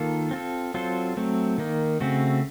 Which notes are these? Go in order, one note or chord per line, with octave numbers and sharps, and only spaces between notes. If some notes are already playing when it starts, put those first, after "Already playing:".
Already playing: D#3 A#3 F4 A4
C4 F4 A4
F#3 C4 F4 A4 C5
F#3 A3 C4
D#3 A#3 D#4
C#3 A3 C4 F#4